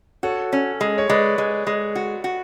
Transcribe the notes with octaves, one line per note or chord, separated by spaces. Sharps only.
F#4 A4 C#5
C#4
G#3
C#5
G#3 B4 D5
G#3
G#3
F#4
F#4